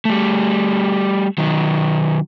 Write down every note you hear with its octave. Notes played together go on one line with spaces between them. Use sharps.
G3 A3
D#3 F#3